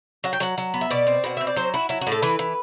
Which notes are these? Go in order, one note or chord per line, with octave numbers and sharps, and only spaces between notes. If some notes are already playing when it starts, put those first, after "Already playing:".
F#3 F#5
G5
F#3 F#5
F#3
B3
E5
B2 D5
C4
B2 F#5
C4 E5
D5
F#3 C5
E4 F#4
F#3 E4
F#4
A2
A4
E3 B4
E3